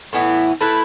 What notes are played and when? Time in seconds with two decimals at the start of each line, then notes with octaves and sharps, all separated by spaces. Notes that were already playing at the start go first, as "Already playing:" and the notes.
0.13 A2 E3 B3 E4
0.61 A3 E4 B4